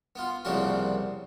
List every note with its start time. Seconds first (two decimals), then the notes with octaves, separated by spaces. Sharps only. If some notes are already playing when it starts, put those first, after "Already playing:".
0.16 B3 F4
0.45 C2 A#2 C#3 F3 C4 F#4